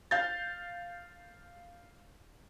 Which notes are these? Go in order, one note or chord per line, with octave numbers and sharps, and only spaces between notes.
F5 G6 A6